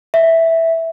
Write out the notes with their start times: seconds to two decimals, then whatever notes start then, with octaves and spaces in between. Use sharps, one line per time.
0.14 E5